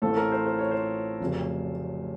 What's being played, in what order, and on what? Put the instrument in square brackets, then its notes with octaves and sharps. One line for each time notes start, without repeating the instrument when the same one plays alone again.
[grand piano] A1 A2 A3 C4 F4 A4
A#4
C5
C5
C#5
C5
F1 F2 C#3 F#3